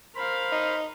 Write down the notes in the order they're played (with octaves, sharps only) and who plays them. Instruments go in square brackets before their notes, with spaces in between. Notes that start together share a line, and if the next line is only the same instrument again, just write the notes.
[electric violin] A#4 F5 [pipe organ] C5 B5
[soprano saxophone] D#4